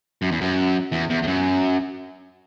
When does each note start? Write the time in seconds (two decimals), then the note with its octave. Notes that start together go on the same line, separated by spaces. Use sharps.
0.22 F#2
0.32 E2
0.41 F#2
0.92 E2
1.10 E2
1.23 E2
1.27 F#2